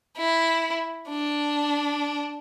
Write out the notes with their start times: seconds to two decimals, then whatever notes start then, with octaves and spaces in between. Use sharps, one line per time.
0.17 E4
1.09 D4